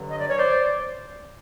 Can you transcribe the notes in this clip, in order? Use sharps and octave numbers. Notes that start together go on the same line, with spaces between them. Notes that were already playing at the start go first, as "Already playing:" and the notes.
Already playing: G2 D3 F#3
D#5
D5
C#5
C5 D5